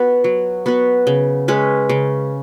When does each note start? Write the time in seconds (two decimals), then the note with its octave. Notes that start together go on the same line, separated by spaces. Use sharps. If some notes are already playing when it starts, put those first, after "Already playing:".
Already playing: B3 F#4 B4
0.24 F#3
0.66 B3 F#4 B4
1.07 C#3
1.48 G#3 C#4 B4
1.89 C#3